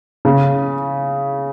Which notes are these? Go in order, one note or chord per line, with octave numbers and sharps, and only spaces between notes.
C#3